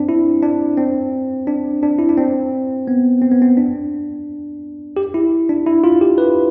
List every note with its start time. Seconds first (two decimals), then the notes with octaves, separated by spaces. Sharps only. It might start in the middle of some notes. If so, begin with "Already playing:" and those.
Already playing: C4 D4
0.09 E4
0.43 D4
0.77 C4
1.47 D4
1.83 D4
1.99 E4
2.09 D4
2.17 C4
2.88 B3
3.22 C4
3.32 B3
3.42 C4
3.57 D4
4.97 G4
5.14 E4
5.49 D4
5.66 E4
5.84 F4
6.01 G4
6.18 B4